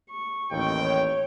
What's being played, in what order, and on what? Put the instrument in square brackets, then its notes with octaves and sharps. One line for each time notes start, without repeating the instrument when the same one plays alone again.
[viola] C#6
[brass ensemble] A1 D#2 G5
[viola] C#5